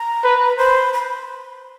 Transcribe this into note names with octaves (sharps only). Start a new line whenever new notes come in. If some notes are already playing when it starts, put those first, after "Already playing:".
Already playing: A#5
B4
C5 B5
B5